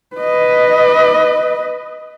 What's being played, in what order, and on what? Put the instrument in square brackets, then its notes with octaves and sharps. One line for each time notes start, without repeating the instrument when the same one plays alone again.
[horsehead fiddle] B4 D#5